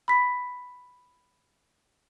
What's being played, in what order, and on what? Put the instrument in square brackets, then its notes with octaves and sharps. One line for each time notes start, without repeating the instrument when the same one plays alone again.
[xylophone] B5 B6